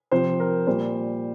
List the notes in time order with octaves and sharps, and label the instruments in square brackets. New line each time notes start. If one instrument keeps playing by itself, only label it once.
[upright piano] C3 F3 C5
A#4
A#2 G3 C5